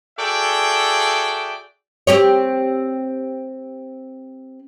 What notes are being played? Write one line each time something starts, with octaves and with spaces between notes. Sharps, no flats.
F#4 G#4 A4 D5 E5 G5
C4 G4 C#5